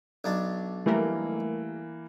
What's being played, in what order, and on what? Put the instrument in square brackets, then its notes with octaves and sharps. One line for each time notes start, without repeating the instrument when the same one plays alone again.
[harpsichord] B1 D4
[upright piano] E3 A#3 [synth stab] G3 A3 A#4